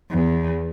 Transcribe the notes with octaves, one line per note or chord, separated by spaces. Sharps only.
E2